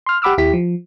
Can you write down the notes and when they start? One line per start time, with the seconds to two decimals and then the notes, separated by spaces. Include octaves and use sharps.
0.06 C6 F6
0.22 G4 F#5 B5 D6 E6 F6
0.38 D#2 E4 G4 B6
0.53 F3